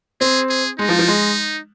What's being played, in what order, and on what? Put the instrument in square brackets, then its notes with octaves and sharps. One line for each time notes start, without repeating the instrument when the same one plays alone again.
[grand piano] C4 [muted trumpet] G#4
[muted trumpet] G#4
[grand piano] G#3 [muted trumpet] D#4
[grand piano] F3
F3
G#3